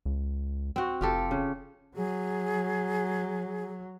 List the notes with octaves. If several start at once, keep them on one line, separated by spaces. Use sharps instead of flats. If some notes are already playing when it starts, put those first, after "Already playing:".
C#2
C4 F#4
F1 F4 G4 A4
C#3
F#3 G#4